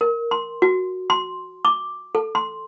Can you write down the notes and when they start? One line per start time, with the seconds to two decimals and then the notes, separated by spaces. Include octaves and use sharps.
0.01 A#4
0.31 C6
0.62 F#4
1.10 C6
1.65 D6
2.15 A4
2.35 C6